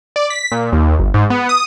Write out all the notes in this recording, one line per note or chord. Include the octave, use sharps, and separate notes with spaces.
D5
B6
A#2
D#2
G1
G#2
B3
D#6